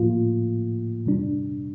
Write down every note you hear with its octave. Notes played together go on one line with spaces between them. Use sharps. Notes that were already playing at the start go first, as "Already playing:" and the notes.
Already playing: A2 F3 A#3 F4
F2 C3 G3 D4